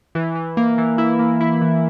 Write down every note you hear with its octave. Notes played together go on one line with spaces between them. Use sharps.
E3
E3
A#3
E3
E4
A#3
E4
E3